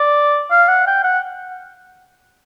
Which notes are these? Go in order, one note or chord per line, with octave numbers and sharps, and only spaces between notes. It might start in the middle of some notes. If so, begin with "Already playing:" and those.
Already playing: D5
F5
F#5
G5
F#5